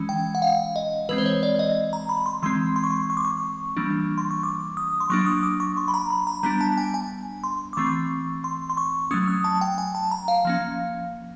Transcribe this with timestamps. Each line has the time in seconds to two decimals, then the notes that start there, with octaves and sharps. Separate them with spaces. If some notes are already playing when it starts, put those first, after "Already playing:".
Already playing: E3 G#3 C#4
0.09 G5
0.35 F#5
0.42 F5
0.76 D#5
1.09 E3 G#3 C4 B4
1.18 C5
1.26 C#5
1.43 D5
1.59 D#5
1.93 A#5
2.09 B5
2.26 C6
2.42 E3 G#3 C4 C6
2.76 C6
2.84 C#6
2.91 C6
3.10 C#6
3.17 D6
3.25 C#6
3.77 E3 G3 A#3 D4
4.18 C6
4.31 C#6
4.43 D6
4.77 D#6
5.00 C6
5.10 F#3 A#3 D4 C#6
5.26 D#6
5.43 D6
5.60 C#6
5.77 C6
5.88 B5
5.94 A#5
6.10 B5
6.27 A#5
6.43 G3 B3 D4 A#5
6.61 A5
6.77 G#5
6.94 G#5
7.44 C6
7.73 D6
7.77 E3 A3 C4 C#6
8.44 C6
8.70 C6
8.77 C#6
9.11 F#3 A3 C#4 D#6
9.28 D#6
9.44 A5
9.61 G5
9.78 G#5
9.95 A5
10.11 A#5
10.28 F5
10.45 F3 A#3 C#4